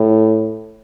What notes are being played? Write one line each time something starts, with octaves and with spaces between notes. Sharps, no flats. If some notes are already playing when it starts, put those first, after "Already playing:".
Already playing: A2